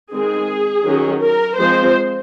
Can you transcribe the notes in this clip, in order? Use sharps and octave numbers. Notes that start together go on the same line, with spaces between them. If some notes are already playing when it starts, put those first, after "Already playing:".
D#3 G#3 C4 G#4
D#3 F#3 C#4
A#4
F3 G#3 C4 C5